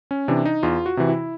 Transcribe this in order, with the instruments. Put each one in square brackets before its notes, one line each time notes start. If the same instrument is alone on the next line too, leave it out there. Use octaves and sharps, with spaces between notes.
[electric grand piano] C#4
C3 E3 D4
D#4
E2 F4
F#4
C3 E3
E4